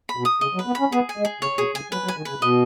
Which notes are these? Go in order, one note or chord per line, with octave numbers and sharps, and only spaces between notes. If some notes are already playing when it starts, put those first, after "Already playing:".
B5
B2
D#6
C#3 D#5
F#3
B4
B3
C#4 B5
B3 G#4
G#5
G#3
G#4
C#3 C#5
B2 G#4
C#3 G#5
F#3 B4
F#3
G#5
D#3
C#3 B4
B2 D#5